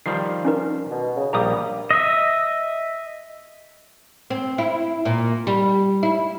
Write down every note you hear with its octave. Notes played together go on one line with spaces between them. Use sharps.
D#3 F3 G3 C7
C#4 D#4 A#4
B2
C#3
A#1 G3 A#3 A#5 D6 D#6
D#5 E5
C4
E4
A#2
G3
E4